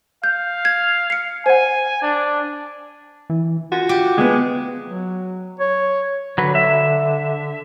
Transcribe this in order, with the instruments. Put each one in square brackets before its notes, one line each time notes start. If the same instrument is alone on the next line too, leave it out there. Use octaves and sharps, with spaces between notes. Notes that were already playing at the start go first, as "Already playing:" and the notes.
[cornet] F5 [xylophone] G6
[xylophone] G#6
C7 C#7
[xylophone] C5 F#5 [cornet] G#5
[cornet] D4
[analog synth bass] E3
[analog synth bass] F4 [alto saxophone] F#4
[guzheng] G4
[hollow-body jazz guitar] D2 B3 [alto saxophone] G#3
[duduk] F#3
C#5
[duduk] D3 [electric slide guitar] F#3 B4
[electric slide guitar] E5